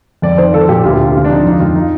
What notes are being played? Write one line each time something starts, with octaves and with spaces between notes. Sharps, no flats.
F2 D5
D#3 C5
F3 A4
A#2 G4
D2 F4
G4
C3 F4
D3 F4
D4
F3 D#4
F2 D#4
F2 F4
D#4